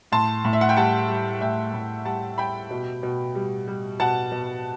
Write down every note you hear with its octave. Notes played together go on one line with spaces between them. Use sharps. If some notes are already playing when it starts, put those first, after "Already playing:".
A2 A5 C6
A2
E5
F#5
G5
G3 F#5 A5
G3
A2 E5 G5
A2
G3 F#5 A5
G3 G5 B5
B2
B2
G3
G3
B2 F#5 A5
B2